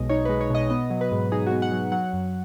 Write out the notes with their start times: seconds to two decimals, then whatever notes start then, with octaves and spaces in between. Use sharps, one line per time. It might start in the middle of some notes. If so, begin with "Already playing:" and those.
Already playing: B1 B2 G#3 D#5
0.09 D#4 C#5
0.25 G#3 B4
0.41 C#5
0.50 B2 D#5
0.70 B3 D#5
0.90 F#3
1.01 B4
1.11 G#2
1.32 D#4 G#4
1.46 B3 F#4
1.62 F#5
1.72 F#3
1.77 F#5
1.92 F#3 F#5
2.13 F#2